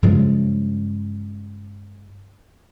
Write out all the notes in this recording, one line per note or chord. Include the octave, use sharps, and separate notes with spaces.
G2 C#3 F3 G#3